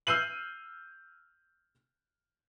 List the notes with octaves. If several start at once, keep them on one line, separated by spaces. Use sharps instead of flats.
E6 F6 G6 C7 D#7 F#7